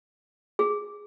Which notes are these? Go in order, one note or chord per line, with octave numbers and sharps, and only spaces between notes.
G#4